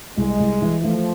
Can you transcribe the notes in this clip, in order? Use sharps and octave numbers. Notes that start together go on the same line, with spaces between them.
C2 G#3
C2
E3
F3 A3